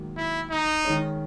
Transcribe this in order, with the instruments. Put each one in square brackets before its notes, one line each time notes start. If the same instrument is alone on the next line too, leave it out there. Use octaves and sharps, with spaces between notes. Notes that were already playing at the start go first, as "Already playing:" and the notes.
Already playing: [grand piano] G#2 D#3 F#3 A#3
[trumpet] E4
D#4
[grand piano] D#3 G#3 C#4